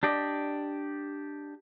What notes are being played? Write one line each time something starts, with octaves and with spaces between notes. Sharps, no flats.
D4 G4 D5 D#5